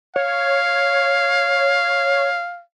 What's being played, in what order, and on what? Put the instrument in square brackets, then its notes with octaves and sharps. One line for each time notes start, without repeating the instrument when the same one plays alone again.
[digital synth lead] C#5 [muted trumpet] F5